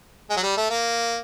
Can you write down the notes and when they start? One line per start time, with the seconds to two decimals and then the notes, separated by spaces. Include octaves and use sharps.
0.30 G#3
0.37 F#3
0.43 G3
0.57 A3
0.70 A#3